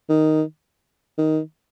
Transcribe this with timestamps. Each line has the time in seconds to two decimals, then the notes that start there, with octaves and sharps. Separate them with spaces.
0.09 D#3
1.18 D#3